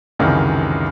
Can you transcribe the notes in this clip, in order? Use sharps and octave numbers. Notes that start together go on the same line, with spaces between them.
C#2 F#2 C3 D#3 E3